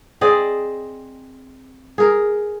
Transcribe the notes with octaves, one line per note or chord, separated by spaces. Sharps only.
C4 G#4 D5 D#5
G#4 A#4